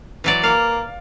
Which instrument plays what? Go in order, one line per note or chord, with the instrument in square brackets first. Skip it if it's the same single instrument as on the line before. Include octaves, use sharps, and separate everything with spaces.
[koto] E3 F#3 D5
[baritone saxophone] A#3 [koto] F5